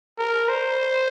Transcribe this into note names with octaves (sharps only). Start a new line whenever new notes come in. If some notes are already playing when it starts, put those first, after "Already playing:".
A#4
C5